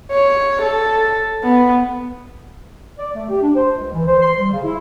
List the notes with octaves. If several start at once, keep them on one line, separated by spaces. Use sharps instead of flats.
C#5
A4
B3
D5
A3
G4
D4
C5
C#2
E3
C5
C6
G3
C#3
E4